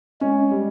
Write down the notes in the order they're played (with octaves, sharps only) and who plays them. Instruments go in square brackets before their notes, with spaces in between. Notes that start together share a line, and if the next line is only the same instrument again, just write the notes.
[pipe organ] G#3 [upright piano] C#4
[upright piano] G3